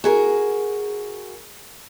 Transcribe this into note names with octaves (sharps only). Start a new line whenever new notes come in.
F#4 G#4 A#4